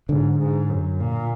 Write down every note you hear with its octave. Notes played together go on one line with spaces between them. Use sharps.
G#2 D3
G#2
F#2
A#2